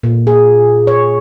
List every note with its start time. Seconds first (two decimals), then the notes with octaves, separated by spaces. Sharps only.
0.03 A#2
0.27 G#4
0.87 C#5